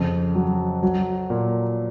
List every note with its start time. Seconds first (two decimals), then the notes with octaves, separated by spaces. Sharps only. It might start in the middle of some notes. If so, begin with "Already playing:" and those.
Already playing: F2 C#3
0.35 F#3
0.83 F#3
1.30 A#2